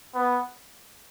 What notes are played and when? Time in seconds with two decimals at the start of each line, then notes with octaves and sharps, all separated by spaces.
0.15 B3